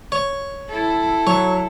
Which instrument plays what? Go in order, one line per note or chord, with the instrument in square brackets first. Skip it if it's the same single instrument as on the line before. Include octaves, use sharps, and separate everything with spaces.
[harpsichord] C#5
[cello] E4 A4
[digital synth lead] F#3 [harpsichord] C#5